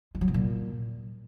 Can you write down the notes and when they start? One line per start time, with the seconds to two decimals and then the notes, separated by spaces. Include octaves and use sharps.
0.15 G#3
0.21 F#3
0.28 C3
0.34 A#2